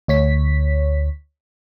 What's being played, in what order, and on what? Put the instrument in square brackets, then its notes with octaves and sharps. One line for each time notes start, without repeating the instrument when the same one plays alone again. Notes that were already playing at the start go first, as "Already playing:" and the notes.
[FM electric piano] D2 C#5 B6